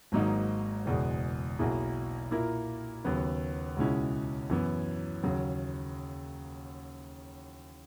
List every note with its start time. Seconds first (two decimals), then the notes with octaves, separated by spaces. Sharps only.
0.12 G#1 G#2 F#3 A#3 D#4
0.86 F#1 E2 B2 G#3
1.59 B1 B2 A#3 E4 G#4
2.31 A#2 A#3 E4 A#4
3.04 D#2 C#3 F#3 B3 F#4
3.77 C#2 B2 G#3 C#4 E4
4.50 F#2 E3 B3
5.23 D#2 C#3 F#3